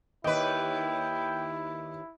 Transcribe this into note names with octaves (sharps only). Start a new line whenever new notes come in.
D#2 E4 B4 D#5 G5